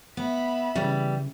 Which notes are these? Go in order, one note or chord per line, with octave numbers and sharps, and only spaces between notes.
B3 E5 B5
C#3 E3 G3